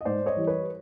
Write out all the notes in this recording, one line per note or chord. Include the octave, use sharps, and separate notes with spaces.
D#5
G#2 C5 D5
C#5 D#5
E3 G3
B4 C#5